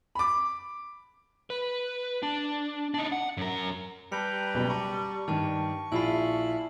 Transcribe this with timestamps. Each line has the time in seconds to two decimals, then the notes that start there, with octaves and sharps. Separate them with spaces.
0.15 B5 D6
1.50 B4
2.23 D4
2.94 D4 D#4
3.12 F#5
3.37 F#2 A#4
4.12 G3 B4 G5 A5 A#5 C#7
4.54 F#1 B2
4.70 A5 A#5 C#6 D6
5.28 G2 D#3 A5 F6
5.92 A#1 E4 F4 G#5 B5 C7